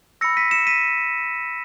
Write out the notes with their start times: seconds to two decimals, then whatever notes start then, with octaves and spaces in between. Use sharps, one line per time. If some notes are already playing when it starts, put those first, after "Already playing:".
0.21 B5 E6 A#6 C#7
0.37 B6 D#7
0.51 C#7 E7
0.67 B6 D#7